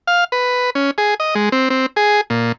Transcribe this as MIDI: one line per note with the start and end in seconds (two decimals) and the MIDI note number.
0.07 0.24 77
0.32 0.70 71
0.75 0.91 61
0.98 1.14 68
1.20 1.35 75
1.35 1.49 56
1.52 1.69 60
1.70 1.86 60
1.96 2.21 68
2.30 2.52 46